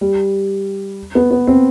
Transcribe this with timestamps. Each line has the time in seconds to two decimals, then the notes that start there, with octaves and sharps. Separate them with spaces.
0.01 G3
1.15 B3
1.31 B3
1.47 C4